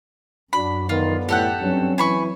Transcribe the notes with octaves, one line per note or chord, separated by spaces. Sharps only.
F#2 D4 F#4 B5
D3 D#3 F3 B3 F4
A2 G4 A4 F#5
G2 F#3 C4 C#4
E3 G#5 B5 C#6